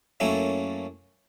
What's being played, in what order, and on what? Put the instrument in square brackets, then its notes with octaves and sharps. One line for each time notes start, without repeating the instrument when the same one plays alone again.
[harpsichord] F#2 A3 A#3 C#4 E4